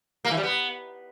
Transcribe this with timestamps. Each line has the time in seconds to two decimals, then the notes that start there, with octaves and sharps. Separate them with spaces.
0.25 A#3
0.31 E3
0.37 G3
0.43 B3